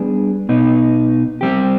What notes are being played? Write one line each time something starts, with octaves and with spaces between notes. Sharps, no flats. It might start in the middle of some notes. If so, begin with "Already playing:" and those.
Already playing: G3 B3 D4 G#4
B2 B3 D#4
G3 C4 G4